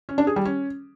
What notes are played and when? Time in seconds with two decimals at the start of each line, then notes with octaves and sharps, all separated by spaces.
0.09 C#4
0.18 D4
0.27 G#4
0.36 G3
0.45 C#4